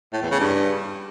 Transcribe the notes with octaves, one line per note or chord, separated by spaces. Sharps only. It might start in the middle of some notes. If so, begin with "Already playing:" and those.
A2
E2
C#3
G2